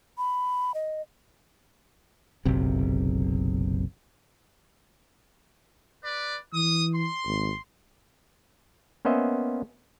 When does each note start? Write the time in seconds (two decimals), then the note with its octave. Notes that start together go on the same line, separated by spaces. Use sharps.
0.18 B5
0.74 D#5
2.45 F#1 B1 C3
6.03 B4 D5
6.54 E3 D#6
6.93 C6
7.27 G#1
9.05 A#3 B3 C#4 C5 D#5 E5